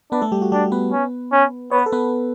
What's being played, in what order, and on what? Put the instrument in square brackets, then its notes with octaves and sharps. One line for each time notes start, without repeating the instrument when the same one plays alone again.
[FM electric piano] B3 B4 [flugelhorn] D4
[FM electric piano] A3 A4
G3 G4
F#4
[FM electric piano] G3 G4 [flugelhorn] D4
[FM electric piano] B3 B4
[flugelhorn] C#4
C#4
[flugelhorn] B3 [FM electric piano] C#5
[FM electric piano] B4
A4
B3 B4